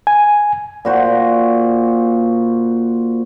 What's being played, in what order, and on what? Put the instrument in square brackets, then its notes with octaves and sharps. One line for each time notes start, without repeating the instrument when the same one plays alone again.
[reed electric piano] G#5
[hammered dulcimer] A#2 F#4 C5